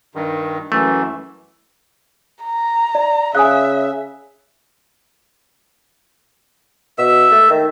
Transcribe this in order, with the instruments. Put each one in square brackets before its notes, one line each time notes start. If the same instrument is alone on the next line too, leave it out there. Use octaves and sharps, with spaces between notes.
[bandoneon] G2 D#3
[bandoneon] F#2 E3 [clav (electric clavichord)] A3
[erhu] A#5
[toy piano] D5
[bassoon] C#3 [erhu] E5 [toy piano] F5 [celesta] G#5 D#6 F#6
[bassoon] B2 [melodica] E5 E6
[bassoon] A3
D#3